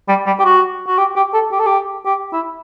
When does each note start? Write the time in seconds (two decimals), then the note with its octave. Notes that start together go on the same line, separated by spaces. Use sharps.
0.09 G3
0.26 G3
0.39 G4
0.45 F#4
0.87 F#4
0.98 G4
1.16 G4
1.34 A4
1.52 G4
1.60 A4
1.67 G4
2.05 G4
2.33 E4